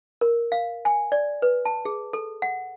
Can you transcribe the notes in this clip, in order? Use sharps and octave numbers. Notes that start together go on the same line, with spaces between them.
A#4
F5
G#5
D5
B4
A5
G#4
A4
F#5